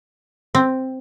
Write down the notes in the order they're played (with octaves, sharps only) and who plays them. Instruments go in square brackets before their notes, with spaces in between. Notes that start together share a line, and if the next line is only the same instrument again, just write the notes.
[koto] C4